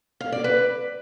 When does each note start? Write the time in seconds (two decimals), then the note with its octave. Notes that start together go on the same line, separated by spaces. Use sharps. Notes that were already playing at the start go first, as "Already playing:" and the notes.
0.21 F5
0.32 D5
0.44 B4